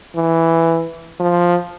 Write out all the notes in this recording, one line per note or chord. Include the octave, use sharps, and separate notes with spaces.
E3
F3